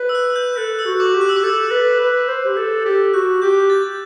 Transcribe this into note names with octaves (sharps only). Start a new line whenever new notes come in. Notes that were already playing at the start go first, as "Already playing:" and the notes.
Already playing: B4
E6
F#6
G6
A4 F#6
E6
F#4
D6
G4
F#6
E6
D6
A4 E6
B4
B4
C5
G4
A4
G4
F#4 F#6
G4 G6
A6